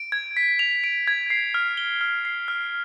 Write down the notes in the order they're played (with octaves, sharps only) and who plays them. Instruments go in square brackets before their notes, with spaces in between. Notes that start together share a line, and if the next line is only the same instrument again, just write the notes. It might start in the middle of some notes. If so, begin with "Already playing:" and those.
Already playing: [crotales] D7
G#6
B6
F7
D7
G#6
C7
F6
G7
F6
C7
F6